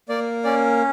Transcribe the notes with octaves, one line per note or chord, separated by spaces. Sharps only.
A#3 D5
C#4 D5